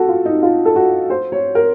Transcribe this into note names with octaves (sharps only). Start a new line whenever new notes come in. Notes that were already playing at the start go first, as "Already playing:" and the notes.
Already playing: F#4 A4
F4
D#4
F4
A4
F#4
C5
C#5
A#4